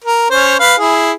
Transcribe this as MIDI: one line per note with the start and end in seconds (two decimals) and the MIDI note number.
0.04 0.30 70
0.30 0.56 61
0.30 0.56 72
0.30 0.56 73
0.60 0.75 71
0.60 0.75 77
0.79 1.12 64
0.79 1.12 68